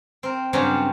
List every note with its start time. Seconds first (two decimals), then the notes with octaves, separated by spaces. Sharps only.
0.23 C4 A#4
0.53 G2 C#3 F#3 G3 C4 C#4